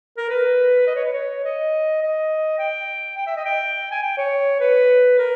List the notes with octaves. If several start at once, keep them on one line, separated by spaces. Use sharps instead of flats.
A#4
B4
D#5
C#5
B4
C#5
D#5
D#5
G5
G5
E5
D#5
G5
G#5
G5
C#5
B4
A#4